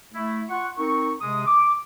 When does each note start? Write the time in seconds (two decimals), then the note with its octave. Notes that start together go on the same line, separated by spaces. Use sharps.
0.13 A3 E4
0.49 F4 F#5 C#6
0.77 C4 D#4 A#4 C#6
1.21 C3 G#3 D#6
1.46 D6